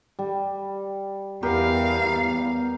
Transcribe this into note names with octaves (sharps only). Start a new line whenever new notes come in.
G3
E2 B3 G4 A#4 B4 F5